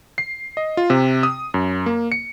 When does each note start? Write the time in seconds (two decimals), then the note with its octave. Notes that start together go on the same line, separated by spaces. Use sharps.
0.18 C7
0.57 D#5
0.77 F4
0.90 C3
1.23 D#6
1.54 F#2
1.86 A#3
2.12 C#7